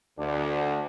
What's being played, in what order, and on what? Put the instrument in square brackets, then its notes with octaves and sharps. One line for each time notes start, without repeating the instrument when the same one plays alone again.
[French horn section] D2 [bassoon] D4